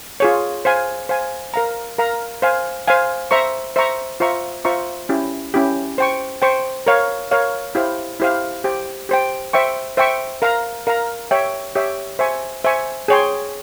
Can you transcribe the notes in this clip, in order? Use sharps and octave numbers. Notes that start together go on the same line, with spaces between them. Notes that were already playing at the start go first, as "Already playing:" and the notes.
F4 G#4 C#5
C5 F5 G#5
C5 F5 G#5
A#4 F5 A#5
A#4 F5 A#5
C5 F5 G#5
C5 F5 G#5
C5 E5 A#5 C#6
C5 E5 A#5 C#6
F4 C5 E5 A#5 C#6
F4 C5 E5 A#5 C#6
C#4 E4 G4
C#4 E4 G4
C5 G5 C#6
C5 G5 C#6
A#4 C#5 F5
A#4 C#5 F5
E4 G4 C5 F5
E4 G4 C5 F5
G4 C5 G5
G4 C5 G5
C5 E5 G5 C#6
C5 E5 G5 C#6
A#4 F5 A#5
A#4 F5 A#5
G4 C#5 E5 G5
G4 C#5 E5 G5
C5 E5 G#5 C#6
C5 E5 G#5 C#6
G#4 C#5 G5 C6